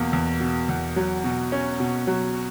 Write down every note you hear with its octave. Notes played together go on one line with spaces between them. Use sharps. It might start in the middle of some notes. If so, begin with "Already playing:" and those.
Already playing: E2 B2 A#3
E2
B2
E2
F#3
B2
C#4
B2
F#3